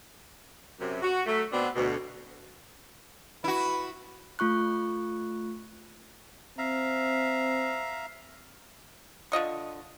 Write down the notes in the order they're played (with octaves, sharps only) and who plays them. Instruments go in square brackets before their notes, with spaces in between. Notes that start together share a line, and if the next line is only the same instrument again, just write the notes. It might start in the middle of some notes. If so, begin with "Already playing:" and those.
[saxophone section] F#2 C3
F#4
F#3 A3
B2 B3 C4 D4
D2 B2
[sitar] E4 F#4 [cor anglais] B4
[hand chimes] A3 F4 C#6 F#6
[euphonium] C4 [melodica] E5 F5 A#5
[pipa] D3 F4 D#5 C#6